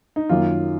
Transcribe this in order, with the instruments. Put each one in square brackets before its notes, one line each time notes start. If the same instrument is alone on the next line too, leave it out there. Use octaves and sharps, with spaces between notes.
[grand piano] D#4
[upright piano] F#2 D#3 A#3 [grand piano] F4